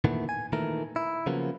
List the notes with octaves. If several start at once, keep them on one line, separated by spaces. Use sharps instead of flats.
A#2 D#3 E3 A3 B3
G#5
A#2 D#3 E3 A3 A#4
E4
C#3 F3 F#3 A#3 B3